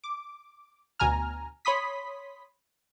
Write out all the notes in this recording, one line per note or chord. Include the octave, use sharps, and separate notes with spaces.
D6
D2 B2 G#5 A#5 F6
C#5 B5 C6 D#6 B6